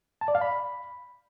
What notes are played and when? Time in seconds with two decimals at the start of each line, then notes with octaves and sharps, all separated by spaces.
0.21 A5
0.28 D5
0.35 F5
0.41 B5